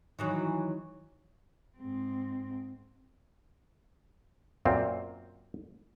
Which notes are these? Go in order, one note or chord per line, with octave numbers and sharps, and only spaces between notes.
D#3 E3 F#3
G#2 C4
F#2 A#2 C4